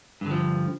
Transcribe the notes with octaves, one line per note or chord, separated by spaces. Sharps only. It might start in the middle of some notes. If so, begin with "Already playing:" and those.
G2 D3 F3